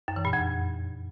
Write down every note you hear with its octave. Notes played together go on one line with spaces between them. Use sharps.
F#2
E3
A#2
F2